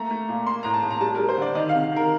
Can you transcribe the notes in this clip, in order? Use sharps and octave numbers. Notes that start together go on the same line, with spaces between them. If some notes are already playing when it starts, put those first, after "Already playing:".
Already playing: A3 A#3 A#5
A3
A#2
A#3 C6
A2 A#5
A5
A2
A#5
G3 A5
A#4
G3
C5
D3 D5
D#3 D#5
F5
C3
D#3 A#4